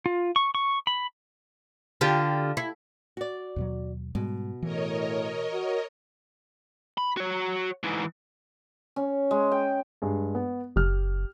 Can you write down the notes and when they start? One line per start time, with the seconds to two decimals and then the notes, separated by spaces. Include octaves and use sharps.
0.06 F4
0.36 C#6
0.55 C#6
0.87 B5
2.01 D3 F4 G4
2.57 E4
3.17 F#4 D5
3.56 D#2 B2 F#3
4.15 G#2 B2 G3 G#3
4.62 A2 E3 A#4 C#5 D#5
5.53 F#4
6.98 B5
7.17 F#4 C#5
7.84 G#2 E3
8.96 C#4
9.31 G#3
9.52 G5
10.02 G2 G#3
10.35 B3
10.76 F#1 G4 F6